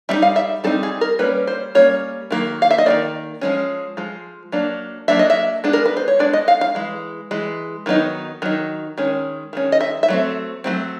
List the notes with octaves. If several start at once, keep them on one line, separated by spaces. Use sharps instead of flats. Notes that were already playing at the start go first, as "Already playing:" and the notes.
G3 C4 D#4 E5
F5
E5
G3 C4 D#4 A4
G#4
A#4
G3 A#3 C#4 B4
C5
G3 A#3 C#4 C#5
D#3 F#3 A#3
F5
E5
D#5
D#3 F#3 A#3 D5
F3 G#3 C#4
F3 G#3
F#3 A#3 D4
F#3 A#3 D4 E5
D#5
E5
G#3 B3 D4
A#4
B4
C5
C#5
G#3 B3 D4 D5
D#5
F5
F5
E3 G#3
E3 G#3
D#3 F#3 B3 D#4
D#3 F#3 D#4
D#3 G#3 C#4
D#3 G#3 C#4
D#5
E5
E5
F#3 A3 C4
F#3 A3 C4